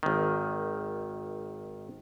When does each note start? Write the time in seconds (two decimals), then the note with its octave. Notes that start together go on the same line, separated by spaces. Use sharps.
0.03 G#1 D#3